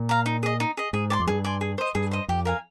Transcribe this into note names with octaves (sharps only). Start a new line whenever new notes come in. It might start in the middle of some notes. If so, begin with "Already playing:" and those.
Already playing: A#2
F5 A#5
D#4
G#4 D#5
D#4
G#4 D#5
G#2 G#4
D5 G#5 C6
F2
G2 G#4
D5 G#5 C6
G#4
C5 D#5
G2 G#4
C5 D#5
F2 G4
A#4 F5 G#5